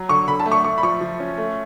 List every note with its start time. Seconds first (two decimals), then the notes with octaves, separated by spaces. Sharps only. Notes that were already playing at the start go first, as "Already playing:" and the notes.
Already playing: F#3
0.09 D3 C#6
0.28 D3 B5
0.40 A5
0.46 A3
0.52 C#6
0.64 A3 C#6
0.78 B5
0.83 F3 C#6
1.01 F3
1.20 C#4
1.38 A3